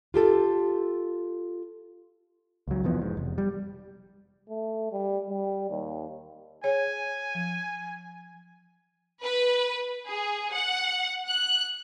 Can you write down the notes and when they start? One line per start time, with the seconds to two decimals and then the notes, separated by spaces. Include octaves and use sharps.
0.14 F4 G4 A4
2.68 C#2 F#3
2.83 F1 E3 F3 B3
3.01 E1 G#2
3.17 F1
3.38 G3
4.50 A3
4.92 G3
5.30 G3
5.70 D#2
6.64 G#4 C#5 G#5
7.35 F3
9.24 B4
10.08 G#4
10.53 F#5
11.28 F#6